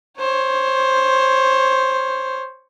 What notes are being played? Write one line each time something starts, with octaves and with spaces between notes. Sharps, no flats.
C5 C#5